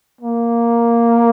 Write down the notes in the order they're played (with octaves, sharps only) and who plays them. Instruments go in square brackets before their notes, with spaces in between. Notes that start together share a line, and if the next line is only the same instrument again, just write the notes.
[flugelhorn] A#3